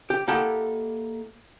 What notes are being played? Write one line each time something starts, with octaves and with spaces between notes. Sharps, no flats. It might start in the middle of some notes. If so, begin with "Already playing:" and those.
G4
A#3 E4 G4 A4 D#5 F#5